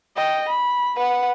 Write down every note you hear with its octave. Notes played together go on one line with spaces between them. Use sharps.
D#5 G5
B5
B4 F#5